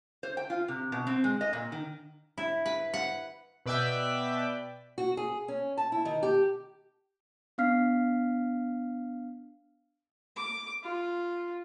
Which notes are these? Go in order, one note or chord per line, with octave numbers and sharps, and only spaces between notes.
C5
G5
F4
C3
B2
C4
G#3
D#5
A#2
D#3
E4
B4
F#5
B2 B4 D5 E5 G5 B6
F#4
G#4
C#4
A5
E4
D#3
G4
B3 D4 F5 F6 B6 C7
D6
F4